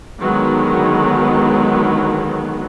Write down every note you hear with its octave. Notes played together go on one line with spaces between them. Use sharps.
D3 D#3 F#3 G#3 B3